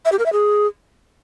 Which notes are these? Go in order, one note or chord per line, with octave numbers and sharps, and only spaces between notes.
E5
G4
A#4
E5
G#4